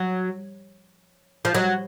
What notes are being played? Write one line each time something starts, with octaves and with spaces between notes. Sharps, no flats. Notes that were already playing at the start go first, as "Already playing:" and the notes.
Already playing: F#3
F3
F#3